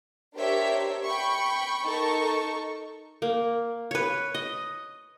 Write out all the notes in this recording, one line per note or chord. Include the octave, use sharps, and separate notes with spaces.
D4 G4 A#4 C5 C#5 E5
G5 B5 C#6
D#4 A4 A#4 A5 C#6
A#3
B4 C#5
D#5